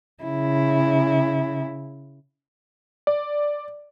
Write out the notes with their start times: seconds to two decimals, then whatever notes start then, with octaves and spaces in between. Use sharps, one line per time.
0.23 C#3 E4
3.07 D5